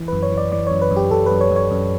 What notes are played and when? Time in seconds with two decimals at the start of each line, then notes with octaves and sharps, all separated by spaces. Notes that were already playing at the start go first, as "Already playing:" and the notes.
Already playing: E3
0.08 B4
0.12 F#2
0.23 C#5
0.32 E3
0.37 D5
0.52 E3 D5
0.67 C#5
0.71 F#2
0.82 B4
0.91 F#2
0.96 G4
1.11 F#2 A4
1.26 B4
1.31 F#2
1.41 C#5
1.51 F#2
1.56 C#5
1.71 F#2